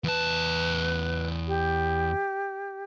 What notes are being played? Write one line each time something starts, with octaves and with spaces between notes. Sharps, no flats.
E2 B4 A5
G4